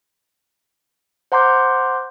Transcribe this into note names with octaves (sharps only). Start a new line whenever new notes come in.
C5 F#5 A#5 C6 D6 G6